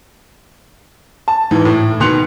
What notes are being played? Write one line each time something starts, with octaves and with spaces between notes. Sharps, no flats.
A5
G#2 E3
A2
B2 D#3 C6 F#6 C#7 F7